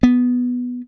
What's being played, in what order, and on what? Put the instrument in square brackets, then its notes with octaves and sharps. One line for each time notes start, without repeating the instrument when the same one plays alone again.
[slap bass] B3